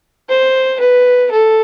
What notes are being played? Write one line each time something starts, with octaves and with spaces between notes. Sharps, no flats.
C5
B4
A4